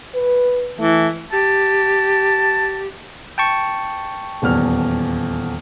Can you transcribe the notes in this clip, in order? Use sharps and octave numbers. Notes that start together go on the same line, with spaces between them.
B4
E3 A3
G4 A5
G5 A5 C#6
D#1 E2 F6